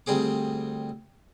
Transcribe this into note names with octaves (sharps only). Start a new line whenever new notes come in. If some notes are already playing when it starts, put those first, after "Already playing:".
D2 G3 C4 G#4 D6